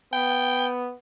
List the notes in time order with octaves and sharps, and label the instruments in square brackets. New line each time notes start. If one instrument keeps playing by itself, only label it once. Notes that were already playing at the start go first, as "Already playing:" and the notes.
[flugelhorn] B3 [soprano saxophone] G5